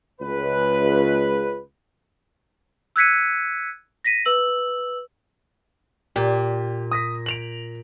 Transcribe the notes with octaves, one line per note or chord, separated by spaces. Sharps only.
C#2 B4
E6 F#6 G#6 B6 C#7 D#7
A#6 B6 D#7
B4 E6 F#7
A#2 G4
D#6 A#6 B6
D7 F7 F#7